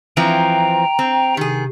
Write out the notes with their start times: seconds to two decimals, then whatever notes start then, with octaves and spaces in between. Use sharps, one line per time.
0.17 E3 F3 C4 G5 A#5
0.99 C4
1.37 C3 D#3 G#4